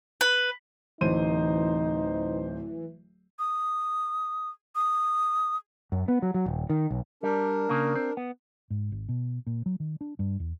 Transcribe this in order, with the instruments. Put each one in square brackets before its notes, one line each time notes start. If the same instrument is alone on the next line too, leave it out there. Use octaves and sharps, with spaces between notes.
[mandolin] B4
[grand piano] D1 C5 D#7 [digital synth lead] E3 [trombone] D#4
[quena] D#6
D#6
[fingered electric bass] F#2
B3
F#3
F#3
D#1
D#3
B1
[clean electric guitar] G3 [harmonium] D4 A#4
[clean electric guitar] C#3 A#3
C4
B3
[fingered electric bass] G#2
G#1
B2
A#2
F#3
D#3
D4
G2
E2